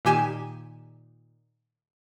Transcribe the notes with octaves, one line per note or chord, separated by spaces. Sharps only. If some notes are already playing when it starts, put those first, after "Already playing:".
A#2 D#3 G4 G#5 E7